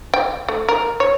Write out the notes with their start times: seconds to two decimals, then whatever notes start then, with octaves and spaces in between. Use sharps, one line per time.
0.14 G5
0.49 A3
0.69 A#4
1.00 C#5